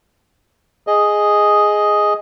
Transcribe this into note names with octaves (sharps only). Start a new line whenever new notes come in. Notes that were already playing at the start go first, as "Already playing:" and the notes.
G#4 D#5